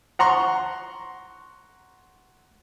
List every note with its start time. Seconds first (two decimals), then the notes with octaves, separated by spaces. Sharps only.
0.19 F#5 A#5 C6 C#6